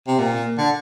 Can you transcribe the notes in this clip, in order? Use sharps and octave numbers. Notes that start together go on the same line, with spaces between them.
C3
A#2
D3